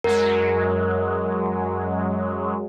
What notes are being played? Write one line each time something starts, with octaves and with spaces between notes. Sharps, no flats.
F#2 F#3 G#3 A#4